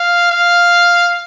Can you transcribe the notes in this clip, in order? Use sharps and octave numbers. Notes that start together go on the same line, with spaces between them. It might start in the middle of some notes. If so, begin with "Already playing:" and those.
Already playing: F5
F5